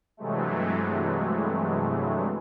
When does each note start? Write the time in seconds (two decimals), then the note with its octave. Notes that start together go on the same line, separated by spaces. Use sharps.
0.17 G2 C3 E3 F#3 G#3 A3